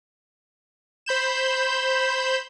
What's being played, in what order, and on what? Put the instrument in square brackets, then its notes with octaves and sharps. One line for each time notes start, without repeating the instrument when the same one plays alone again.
[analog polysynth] C5 B5 G6 E7